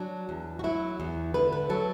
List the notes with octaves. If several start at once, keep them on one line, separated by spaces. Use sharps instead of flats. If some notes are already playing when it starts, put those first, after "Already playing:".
Already playing: F#3 D4
E2
F#4
F#3 E4
E2
D3 B4
B4
F#3 A4